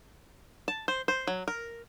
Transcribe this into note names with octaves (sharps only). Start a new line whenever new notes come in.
A5
C5
C5
F#3
A#4